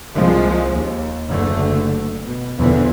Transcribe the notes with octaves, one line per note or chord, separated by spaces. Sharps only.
C2 F3 G#3 A#3
D#2
F#1 D3 A3
B2
B1 E2 A#2 D3 E3 F3